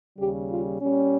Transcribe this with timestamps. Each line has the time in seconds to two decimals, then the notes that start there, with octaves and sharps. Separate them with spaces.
0.17 D#2 C#3 G3 G4
0.49 F4
0.80 A#2 G3 C#4